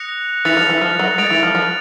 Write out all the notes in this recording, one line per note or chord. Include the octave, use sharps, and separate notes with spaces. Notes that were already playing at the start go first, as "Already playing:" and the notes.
Already playing: D#6 F#6 A#6 C#7 F7
E3 A6 C#7 F7
F3
E3
F3
F#3
G#3 A6 D7 F7
E3
F3
F3